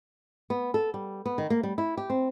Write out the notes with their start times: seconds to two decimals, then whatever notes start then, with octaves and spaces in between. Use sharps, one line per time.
0.50 B3
0.74 A4
0.94 G3
1.26 B3
1.38 D#3
1.50 A#3
1.63 G3
1.78 E4
1.97 G4
2.10 C4